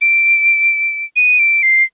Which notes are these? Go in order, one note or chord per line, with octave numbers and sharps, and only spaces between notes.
D7
D#7
D7
C7